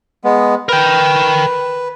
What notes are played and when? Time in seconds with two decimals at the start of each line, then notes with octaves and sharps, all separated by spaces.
0.24 G#3 B3
0.69 A#4 B4 G5